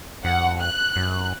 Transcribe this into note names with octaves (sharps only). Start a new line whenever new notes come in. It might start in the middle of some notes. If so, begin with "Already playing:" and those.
F2 F#5
F#6
F#2